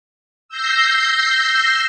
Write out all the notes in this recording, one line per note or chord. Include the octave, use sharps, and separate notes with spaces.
E6 G6 A#6 C7